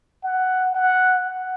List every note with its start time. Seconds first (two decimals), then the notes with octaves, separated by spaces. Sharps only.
0.24 F#5
0.74 F#5
1.26 F#5